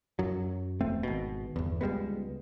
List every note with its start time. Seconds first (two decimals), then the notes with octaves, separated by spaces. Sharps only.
0.19 F#2 F#3
0.81 E1 A3 C4
1.03 G#1 B2
1.56 G1 E2
1.81 C#2 G3 G#3 B3